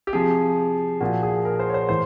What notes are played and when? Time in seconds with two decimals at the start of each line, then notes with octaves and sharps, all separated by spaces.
0.07 G4
0.13 C3 F3 G#4
1.00 A#2 F3 F#4
1.23 G#4
1.45 A#4
1.60 C5
1.70 C#5
1.74 C5
1.89 A2 E3 C5